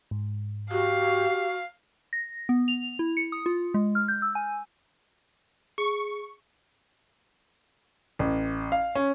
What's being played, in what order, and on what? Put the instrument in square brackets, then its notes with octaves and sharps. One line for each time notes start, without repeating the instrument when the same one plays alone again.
[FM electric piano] G#2
[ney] F#4 [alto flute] G4 [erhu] F5
[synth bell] A#6
B3
F7
E4
C#7
D#6
F4
G#3
F6
G6
E6
G#5
[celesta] G#4 [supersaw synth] C#6
[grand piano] A1
F5
C#4